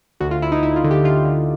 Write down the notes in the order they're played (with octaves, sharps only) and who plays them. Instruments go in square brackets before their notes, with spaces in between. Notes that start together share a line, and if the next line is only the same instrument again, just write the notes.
[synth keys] D2 F#4
F4
D2 E4
D#4
D2 E4
F4
D3
G4
D3 F4
D3